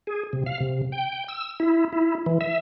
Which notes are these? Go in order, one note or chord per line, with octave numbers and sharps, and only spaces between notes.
G#4
C3
F5
C3
G5
E6
E4
E4
E3
E5